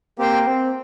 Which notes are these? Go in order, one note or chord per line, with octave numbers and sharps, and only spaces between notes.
A#3 C4 G4 C5 G5
C4